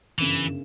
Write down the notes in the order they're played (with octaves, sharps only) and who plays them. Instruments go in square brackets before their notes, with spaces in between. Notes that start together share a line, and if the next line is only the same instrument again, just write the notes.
[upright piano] G1 F#2 C#3 [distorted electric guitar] E3